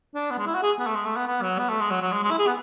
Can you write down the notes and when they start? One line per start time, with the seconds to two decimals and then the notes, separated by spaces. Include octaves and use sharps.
0.15 D4
0.30 B3
0.38 G#3
0.46 E4
0.55 F#4
0.62 G#4
0.79 B3
0.86 A3
0.95 G#3
1.06 A3
1.16 B3
1.27 B3
1.42 F#3
1.59 B3
1.69 A3
1.80 G#3
1.91 F#3
2.01 F#3
2.12 G#3
2.23 G#3
2.30 E4
2.39 G#4
2.47 B3